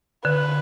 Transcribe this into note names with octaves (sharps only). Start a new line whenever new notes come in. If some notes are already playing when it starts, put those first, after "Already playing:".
D3 B4